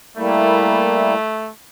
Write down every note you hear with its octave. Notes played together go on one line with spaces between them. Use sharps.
G3 A3 A#3 E4